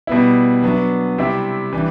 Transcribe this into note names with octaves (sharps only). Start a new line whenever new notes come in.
B2 G3 B3 E4
F#3 B3 D4
C3 G3 C4 E4
E3 G3 D4